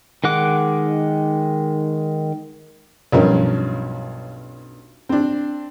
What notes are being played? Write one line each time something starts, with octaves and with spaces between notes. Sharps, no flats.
D#3 G#3 F#5 D6
B1 G2 F3 C#4 A#4
C4 D4